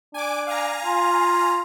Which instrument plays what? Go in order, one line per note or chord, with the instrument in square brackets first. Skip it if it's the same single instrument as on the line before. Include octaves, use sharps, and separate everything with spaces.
[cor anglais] D4 [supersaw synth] G#5 D6
[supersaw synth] F5 G#5 A#5
[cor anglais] F4